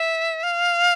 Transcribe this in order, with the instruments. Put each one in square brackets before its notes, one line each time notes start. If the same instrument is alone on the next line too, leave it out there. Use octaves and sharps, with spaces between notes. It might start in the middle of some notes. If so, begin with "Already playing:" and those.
Already playing: [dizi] E5
F5